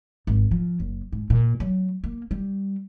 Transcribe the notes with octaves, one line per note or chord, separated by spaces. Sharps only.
G#1
F3
F#1
G#2
A#2
F#3
A#3
G3